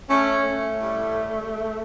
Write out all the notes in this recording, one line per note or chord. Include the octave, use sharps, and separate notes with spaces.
A3 C#4
A3
A2 G3